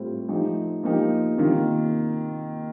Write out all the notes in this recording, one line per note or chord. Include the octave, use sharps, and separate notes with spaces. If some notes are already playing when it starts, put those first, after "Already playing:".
Already playing: A2 G3 C4 F4
F3 A3 D#4 G4
F3 A#3 D#4 G4
C3 D#3 A#3 F4